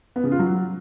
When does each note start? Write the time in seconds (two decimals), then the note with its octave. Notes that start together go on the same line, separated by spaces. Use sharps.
0.16 B3
0.24 C#3
0.31 F4
0.39 F#3